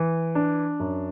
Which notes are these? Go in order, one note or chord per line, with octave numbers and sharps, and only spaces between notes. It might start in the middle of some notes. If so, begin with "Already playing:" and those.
Already playing: E3
D4
F#2